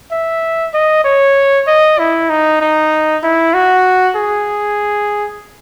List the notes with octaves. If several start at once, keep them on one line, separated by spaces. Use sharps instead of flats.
E5
D#5
C#5
D#5
E4
D#4
D#4
E4
F#4
G#4